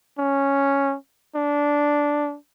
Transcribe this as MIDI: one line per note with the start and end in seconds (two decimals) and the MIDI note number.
0.19 0.95 61
1.36 2.37 62